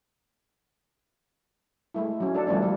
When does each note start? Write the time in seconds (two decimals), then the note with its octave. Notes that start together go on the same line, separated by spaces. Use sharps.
1.94 G#3 A3 E4
2.20 F#3 C#4
2.34 D4 A4
2.47 D#3 F3 G3 A3 C#4 D4
2.62 G3 A#3